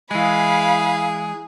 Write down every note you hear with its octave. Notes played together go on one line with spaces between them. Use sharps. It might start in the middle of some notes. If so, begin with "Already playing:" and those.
E3 G#3 G#4 F5 B5